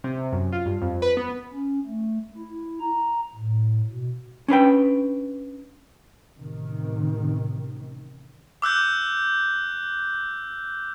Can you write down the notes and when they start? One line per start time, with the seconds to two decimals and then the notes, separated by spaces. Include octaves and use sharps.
0.04 C3
0.32 F#2
0.53 F4
0.66 G2
0.82 F2
1.02 B4
1.17 B3
1.52 C#4
1.86 A3
2.37 E4
2.80 A#5
3.35 A2
3.90 B2
4.48 C#4 D4 B4 G5
6.38 A1 C3 D#3
8.62 D6 E6 F#6 G6